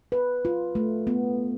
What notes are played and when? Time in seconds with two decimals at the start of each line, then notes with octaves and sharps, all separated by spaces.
0.12 B4
0.45 F4
0.75 A3
1.07 B3